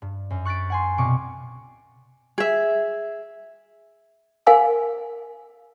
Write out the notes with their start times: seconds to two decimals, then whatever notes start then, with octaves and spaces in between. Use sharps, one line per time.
0.02 G2
0.30 F#2
0.45 C#6 F#6 A6 B6 D7
0.70 F#5 G#5 C6
0.98 C2 B2 F4 C#6 D6
2.38 G#4 E5
4.46 A#4 F5 G#5 E6